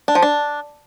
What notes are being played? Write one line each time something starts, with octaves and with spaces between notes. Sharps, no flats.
D4
F3
D4